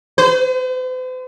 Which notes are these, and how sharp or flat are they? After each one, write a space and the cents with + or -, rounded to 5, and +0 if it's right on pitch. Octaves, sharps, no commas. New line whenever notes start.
C5 -45